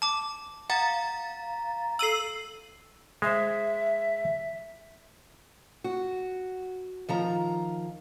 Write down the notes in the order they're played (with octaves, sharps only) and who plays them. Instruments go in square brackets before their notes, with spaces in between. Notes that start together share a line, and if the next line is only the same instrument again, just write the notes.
[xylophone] A5 D6
[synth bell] F5 A#5 A6 [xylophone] F#5
[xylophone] A4 D#7 F#7 [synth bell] E6 C7
[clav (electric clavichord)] G#3 C5 [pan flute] E5
[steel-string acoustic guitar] F#4
D#3 F3 A#5